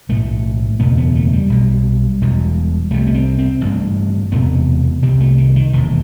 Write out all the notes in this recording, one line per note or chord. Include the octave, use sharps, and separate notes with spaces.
B1 A2 A3
F#1 E2 B2 B3
B3
A3
G3
B1 B2
E1 E2 B2
C2 C3 A3
B3
C4
C4
A1 G2
E1 E2 C3 B3
C2 C3 C4
A3
D#3
D#3
E1 D#2 E3